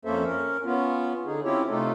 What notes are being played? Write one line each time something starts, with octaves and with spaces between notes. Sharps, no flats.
F2 A#3 C#4 A4 C5 E5
C#4 A#4
B3 C#4 F4
D3 D#4 G#4
C4 C#4 E4 F4 G4 C#5
C3 A3 D#4 F4 A4